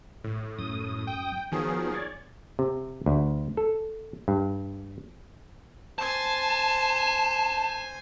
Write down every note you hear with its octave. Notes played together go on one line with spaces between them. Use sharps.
A2
F#2 D#6
G5
D#3 F3 F#3 B3 G#4
C#5 D5
C3
D2
A4
G2
C5 G#5 A5